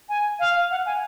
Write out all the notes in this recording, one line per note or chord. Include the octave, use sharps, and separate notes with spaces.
G#5
F5
F#5
G#5